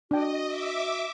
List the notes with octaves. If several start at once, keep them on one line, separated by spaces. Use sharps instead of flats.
D4 F#4 D#5 G5
E5 D6